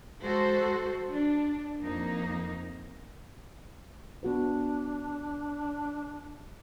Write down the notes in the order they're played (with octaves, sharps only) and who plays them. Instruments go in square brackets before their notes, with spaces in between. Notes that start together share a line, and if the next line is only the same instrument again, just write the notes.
[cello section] G#3 F#4 A4 C5
D4
F2 A#3 D#4
[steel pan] B3 F#4 B4 [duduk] D4